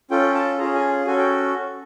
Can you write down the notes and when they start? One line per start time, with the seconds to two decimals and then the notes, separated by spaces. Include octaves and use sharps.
0.11 C#4 F4 A4 G5
0.35 A5
0.59 C#4 F4 G#4 A#5
0.74 G#5
1.07 C#4 F#4 A4 G#5
1.18 G5